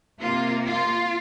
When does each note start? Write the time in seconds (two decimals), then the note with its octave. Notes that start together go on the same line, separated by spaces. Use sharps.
0.22 C3 A#3 F4
0.66 F4